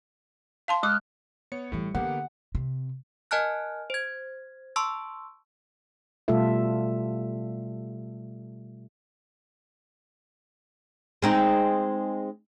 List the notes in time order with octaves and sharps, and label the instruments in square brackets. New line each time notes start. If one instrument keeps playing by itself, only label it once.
[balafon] F5 A5 C6
[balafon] G#3 D6 [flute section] D#6 F6 F#6
[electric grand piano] B3 C#5 C#7
[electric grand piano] A2 [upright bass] E3 G3
[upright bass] D3 [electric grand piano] A#3 B3 G4 [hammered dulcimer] F#5
[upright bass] C3
[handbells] A#4 D#5 G#5 A5 F6 F#6
C5 G#6
A5 C6 C#6 E6
[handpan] B2 G3 A3 F4 A4 E5
[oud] G#3 C4 D#4